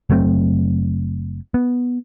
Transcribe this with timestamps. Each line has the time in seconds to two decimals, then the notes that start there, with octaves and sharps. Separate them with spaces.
0.10 F#1 F#3 A3 C4
1.54 B3